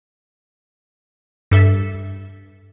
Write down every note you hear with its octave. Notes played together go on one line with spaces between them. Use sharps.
G2 A4 E5